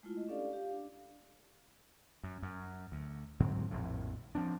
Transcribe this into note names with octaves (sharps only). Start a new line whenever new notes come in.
G#3 A3 E4 F4
D#5
C#4 D4 G4 A4 D5 F5
G4 F5
D4
F#2
F#2
D2
G#2 D3 F#3 C4
A#1 F2 A2
F3 C4 D4